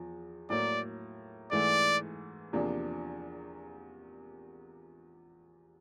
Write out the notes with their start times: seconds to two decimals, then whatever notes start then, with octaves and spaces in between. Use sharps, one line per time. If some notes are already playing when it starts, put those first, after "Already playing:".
Already playing: E2 F3
0.50 A2 F#3 A#3 D5
1.52 G#2 E3 A3 D5
2.53 E2 C3 F3 A#3 D4